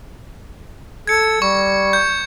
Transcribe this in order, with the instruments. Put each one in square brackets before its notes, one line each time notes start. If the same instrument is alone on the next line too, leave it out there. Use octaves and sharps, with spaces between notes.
[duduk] A4 [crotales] G#6 C#7
[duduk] G3 [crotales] C#6
[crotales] G6